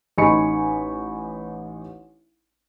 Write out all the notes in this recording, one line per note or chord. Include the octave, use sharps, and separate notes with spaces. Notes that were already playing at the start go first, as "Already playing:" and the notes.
A1 D#4 G#5 B5 C#6 C#7